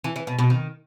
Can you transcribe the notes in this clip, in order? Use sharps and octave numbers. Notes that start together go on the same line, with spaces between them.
E3
E3
B2
B2
D#3